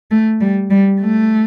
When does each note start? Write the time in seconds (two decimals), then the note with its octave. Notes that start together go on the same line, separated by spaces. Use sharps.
0.11 A3
0.41 G3
0.70 G3
1.00 A3